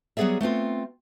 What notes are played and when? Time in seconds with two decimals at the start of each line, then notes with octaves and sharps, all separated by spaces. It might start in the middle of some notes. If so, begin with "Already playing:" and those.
0.17 F#3 G3 B3 G#4 D5 E5
0.41 A3 B3 C4 F4